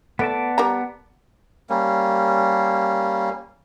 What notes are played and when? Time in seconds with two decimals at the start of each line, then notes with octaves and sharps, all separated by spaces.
0.19 A3 B3 D5 A5
0.58 G3 A#4 A#5
1.70 G3 A#3 C#4